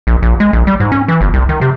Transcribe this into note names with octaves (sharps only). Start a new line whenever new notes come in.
A#1
A#1
G#3
A#1
G3
G#2
C#4
E3
G1
C2
D#3
C3